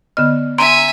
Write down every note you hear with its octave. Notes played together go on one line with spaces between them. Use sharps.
D3 B3 D#5 F6
E5 G#5 A#5 C6 D7